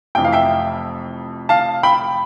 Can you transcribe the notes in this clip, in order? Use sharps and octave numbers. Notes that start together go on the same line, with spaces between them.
F1 F2 E3 G5
F5
E5 G5
F5 A5
G5 B5